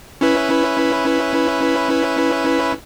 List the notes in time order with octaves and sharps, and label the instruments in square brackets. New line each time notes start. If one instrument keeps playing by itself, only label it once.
[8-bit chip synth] C#4 E4 B4